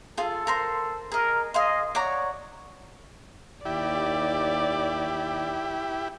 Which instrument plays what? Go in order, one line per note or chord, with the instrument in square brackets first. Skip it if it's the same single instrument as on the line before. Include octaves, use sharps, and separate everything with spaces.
[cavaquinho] F4 G#4 [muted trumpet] A4
[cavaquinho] A#4 C5 C6
[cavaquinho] G#4 D#5 [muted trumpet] A#4
[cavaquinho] G#4 F5 C6 [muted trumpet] D#5
[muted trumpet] C#5 [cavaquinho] D5 F#5 A#5
[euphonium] D#2 [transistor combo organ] E4 G4 [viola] D5